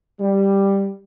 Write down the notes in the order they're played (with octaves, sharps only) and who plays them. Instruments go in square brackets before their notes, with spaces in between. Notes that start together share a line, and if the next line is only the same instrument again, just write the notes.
[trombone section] G3